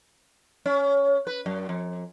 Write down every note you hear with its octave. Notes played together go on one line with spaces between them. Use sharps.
C#4
B4
F#2
F2